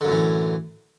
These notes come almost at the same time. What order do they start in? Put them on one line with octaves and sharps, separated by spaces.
D3 F#2 A2 E3